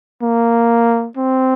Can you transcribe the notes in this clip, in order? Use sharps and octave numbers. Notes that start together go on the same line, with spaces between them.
A#3
C4